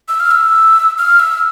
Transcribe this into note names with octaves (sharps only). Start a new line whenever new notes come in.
E6
F6
E6
F6
E6